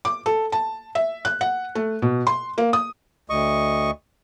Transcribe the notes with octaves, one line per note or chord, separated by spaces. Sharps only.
D6
A4
A5
E5
F#6
F#5
A3
B2
C6
A#3
D#6
D2 D#5 C#6